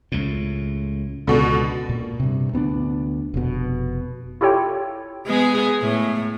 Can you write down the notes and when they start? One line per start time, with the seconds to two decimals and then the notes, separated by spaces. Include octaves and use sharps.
0.12 C#2 A2
1.27 C#2 B2 D3
1.89 A#2
2.20 G2 C3
2.53 D2 B3 C#4 D4
3.34 F1 B2
4.41 E4 F4 G4 A4 C#5 G5
5.27 G#3 B3 G#4
5.82 A2